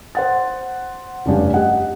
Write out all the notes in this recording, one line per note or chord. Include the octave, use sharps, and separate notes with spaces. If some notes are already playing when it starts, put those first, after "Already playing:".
C5 F#5 A6
F1 G2 C#4 D4 G4 F5
G4 D#5 F#5